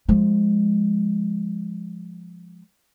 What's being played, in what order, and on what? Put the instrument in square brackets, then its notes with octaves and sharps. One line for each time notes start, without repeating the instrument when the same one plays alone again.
[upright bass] F3 G#3